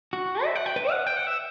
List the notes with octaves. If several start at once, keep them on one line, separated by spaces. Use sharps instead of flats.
F#4
E5
F#5
G5
B4
F#5
G5
F#5
E5